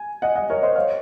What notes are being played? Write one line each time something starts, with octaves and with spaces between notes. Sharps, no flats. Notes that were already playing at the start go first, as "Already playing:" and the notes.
Already playing: G#5
D#5 F#5
D#5 F#5
A#4 C#5
C5 D#5
C#5 F5